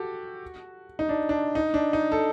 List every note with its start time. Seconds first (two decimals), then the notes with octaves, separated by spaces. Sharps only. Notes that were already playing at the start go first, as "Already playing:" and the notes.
Already playing: F#4 G4 A4
0.99 D#4
1.09 D4
1.29 D4
1.55 D#4
1.74 D4
1.93 D#4
2.12 A4